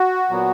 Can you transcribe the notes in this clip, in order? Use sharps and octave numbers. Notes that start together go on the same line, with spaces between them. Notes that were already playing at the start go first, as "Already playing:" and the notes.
Already playing: F#4
A#2 F#3 B3